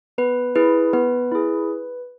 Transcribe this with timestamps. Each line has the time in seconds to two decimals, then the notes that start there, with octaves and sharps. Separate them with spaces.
0.18 B3 B4
0.55 E4 G#4 B4
0.93 B3 B4
1.32 E4 G#4